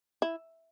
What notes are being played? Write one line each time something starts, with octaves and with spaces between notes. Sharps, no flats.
E4